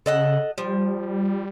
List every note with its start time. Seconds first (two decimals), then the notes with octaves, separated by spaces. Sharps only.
0.06 C#3 A4 D#5 F#5
0.58 F3 G3